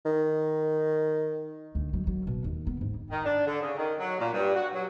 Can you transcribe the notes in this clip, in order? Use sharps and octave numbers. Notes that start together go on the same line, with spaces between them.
D#3
D2
F#3
F#3
B2
D#2
B3
G#2
D#3
D4
D3
C#3
D#3
F#3
A#2
G2
F#4
F#3